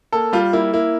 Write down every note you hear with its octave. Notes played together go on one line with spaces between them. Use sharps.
A#3 A4
G3 F4
A#3 E4
A#3 E4